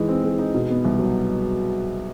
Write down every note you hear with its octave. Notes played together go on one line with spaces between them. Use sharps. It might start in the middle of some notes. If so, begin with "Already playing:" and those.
Already playing: E3 G#3 D#4
C4
G#3
D#4
B2
B3
C2
F#3